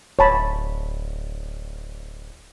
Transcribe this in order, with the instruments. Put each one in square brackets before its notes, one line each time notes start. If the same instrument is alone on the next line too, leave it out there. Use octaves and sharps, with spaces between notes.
[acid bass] D1 [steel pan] C#5 A5 B5